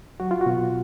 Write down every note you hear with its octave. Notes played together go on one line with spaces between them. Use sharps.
F#3 F#4
F4
F#4
B2